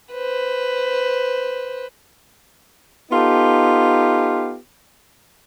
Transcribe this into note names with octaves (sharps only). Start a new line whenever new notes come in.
B4 C5
B3 D#4 F4 G4 A4